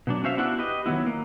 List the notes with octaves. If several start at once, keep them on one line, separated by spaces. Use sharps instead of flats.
B2 F#3 D4
C#4 F#4 C5 E5 F5
B3 D4 E4 F#4
G4 B4 D#5
D#3 F#3 B3 E4
A#3